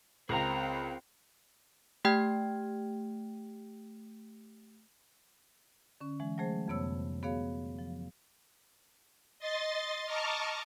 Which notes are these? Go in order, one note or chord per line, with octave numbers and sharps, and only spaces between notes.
C#2 C4 G#4 A#4 A#5
A3 G4 G5 F6 G#6
D3 C#4
E3 G#3
F#3 G3 A3 G#4 C5
F2 C3 B3 C#5 E6
B3 F#4 G#4 C#5 F5
F3
D#5 C6 A6
D#5 A5 A#5 C#6 D6 F6